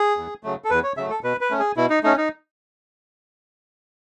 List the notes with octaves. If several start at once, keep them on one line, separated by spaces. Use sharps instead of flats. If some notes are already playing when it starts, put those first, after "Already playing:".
Already playing: G#4
E2
C#3 F#3 A3
A4
E2 B4
C#5
C#3 F#3 A3 E5
A4
B2 B4
B4
A3 C#4
G#4
B2 E4
D#4
A3 C#4 D#4
D#4